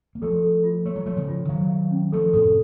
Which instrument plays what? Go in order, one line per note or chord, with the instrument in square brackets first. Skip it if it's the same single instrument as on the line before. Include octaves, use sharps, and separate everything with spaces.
[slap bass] A#3
[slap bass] F3 A3 [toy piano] A4
[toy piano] A4
F4
[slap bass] A3 [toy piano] C#5
[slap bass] F#3
[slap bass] F3 A3 [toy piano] C#5
[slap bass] C#3 F3
[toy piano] F4
[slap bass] D#3 F#3 [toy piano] F5
[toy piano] F5
C#4
[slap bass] F3 A3 [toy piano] A4
[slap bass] A2 C3 [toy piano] A4